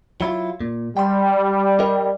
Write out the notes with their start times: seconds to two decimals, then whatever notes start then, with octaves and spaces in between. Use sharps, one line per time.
0.21 F#3 E4 F4
0.60 A#2
0.97 G3 G5 C6
1.80 A#4 D#5